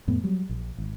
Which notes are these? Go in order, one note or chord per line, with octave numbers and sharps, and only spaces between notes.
F2 A2 B3
F#3 G3
A#1
G#1